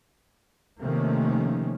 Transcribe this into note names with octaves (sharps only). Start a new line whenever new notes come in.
C3 D#3 F3 A3 A#3 C#4